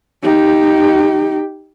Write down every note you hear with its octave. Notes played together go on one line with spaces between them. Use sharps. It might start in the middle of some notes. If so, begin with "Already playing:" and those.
D#4 G4